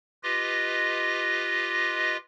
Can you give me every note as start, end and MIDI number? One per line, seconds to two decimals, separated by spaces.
0.23 2.17 65
0.23 2.17 67
0.23 2.17 71
0.23 2.17 75
0.23 2.17 94